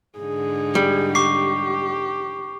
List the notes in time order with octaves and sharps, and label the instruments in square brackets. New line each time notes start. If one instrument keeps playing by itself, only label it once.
[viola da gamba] G#2 D3 D#4 [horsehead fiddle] G#4
[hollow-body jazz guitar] G3
[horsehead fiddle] G4 [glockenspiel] C#6 D6 C7